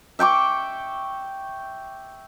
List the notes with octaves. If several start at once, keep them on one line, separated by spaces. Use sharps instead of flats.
E5 G5 C#6 D6